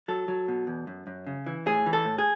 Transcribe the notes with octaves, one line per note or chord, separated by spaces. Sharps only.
F#3 A4
F#3
B2
E2
F#2
F#2
C#3
E3
A2 G#4
E3
A4
A2
G#4